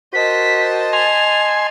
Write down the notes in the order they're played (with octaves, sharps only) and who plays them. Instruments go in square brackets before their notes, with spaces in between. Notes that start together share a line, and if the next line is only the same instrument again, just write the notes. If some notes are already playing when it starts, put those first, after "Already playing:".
[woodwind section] F#4 A#4 C5 [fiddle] D#5 A5 [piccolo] B6
[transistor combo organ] G#5 C6 [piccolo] F7